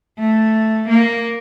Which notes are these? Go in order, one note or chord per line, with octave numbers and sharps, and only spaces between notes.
A3
A#3